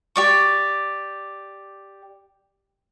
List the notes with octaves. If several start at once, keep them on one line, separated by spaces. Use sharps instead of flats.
G4 D5 C#6